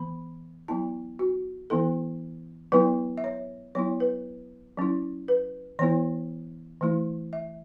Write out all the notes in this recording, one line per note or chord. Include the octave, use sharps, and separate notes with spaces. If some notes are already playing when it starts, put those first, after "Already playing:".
Already playing: E3 B3 B5
F#3 B3 E4 A5
F#4
E3 B3 E4 A4
F#3 B3 E4 B4
E5
C#5
F#3 B3 E4 C#5
B4
F#3 C#4 E4
B4
E3 B3 E4 C#5
E3 A3 E4
E5